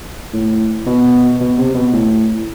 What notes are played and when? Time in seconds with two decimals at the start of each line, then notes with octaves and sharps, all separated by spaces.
0.33 A2
0.86 B2
1.40 B2
1.58 C3
1.75 B2
1.93 A2